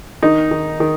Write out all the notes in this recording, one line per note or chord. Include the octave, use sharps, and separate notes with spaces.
D#3 D#4
D#3
D#3